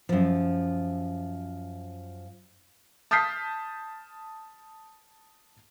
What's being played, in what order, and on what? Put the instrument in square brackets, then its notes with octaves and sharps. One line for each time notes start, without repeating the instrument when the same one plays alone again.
[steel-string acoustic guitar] F#2 F3
[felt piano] A5 D#6 F6 G6 B6 C7